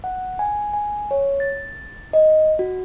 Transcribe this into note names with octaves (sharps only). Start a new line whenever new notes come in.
F#5
G#5
G#5
C#5
A6
D#5
F#4